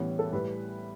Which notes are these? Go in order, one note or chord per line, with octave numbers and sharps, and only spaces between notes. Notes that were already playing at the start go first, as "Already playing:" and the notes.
Already playing: A2 E3 G3 B3 C#4
A4
A2 G3 B4